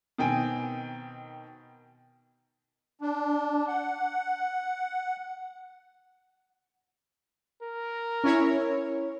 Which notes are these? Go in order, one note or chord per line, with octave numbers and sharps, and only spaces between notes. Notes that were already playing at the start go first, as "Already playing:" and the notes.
B2 D#3 C4 G5 G#5
D4
F#5
A#4
C#4 E4 C#5